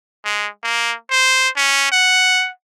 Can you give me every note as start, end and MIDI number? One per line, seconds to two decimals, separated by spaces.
0.25 0.48 56
0.63 0.95 58
1.11 1.49 72
1.57 1.91 61
1.92 2.50 78